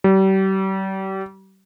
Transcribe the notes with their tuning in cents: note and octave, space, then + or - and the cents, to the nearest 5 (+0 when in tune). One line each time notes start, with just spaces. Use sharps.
G3 -35